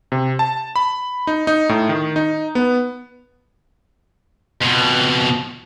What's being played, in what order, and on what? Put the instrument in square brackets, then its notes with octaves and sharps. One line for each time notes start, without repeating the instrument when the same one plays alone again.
[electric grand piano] C3
A5
B5
D#4
D#4
A2
D#3
D#4
B3
[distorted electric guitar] F2 B2